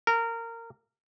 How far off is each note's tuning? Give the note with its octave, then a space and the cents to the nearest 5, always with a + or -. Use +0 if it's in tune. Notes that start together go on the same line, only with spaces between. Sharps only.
A#4 -20